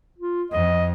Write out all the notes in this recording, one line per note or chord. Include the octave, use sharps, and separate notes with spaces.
F4
F2 D#5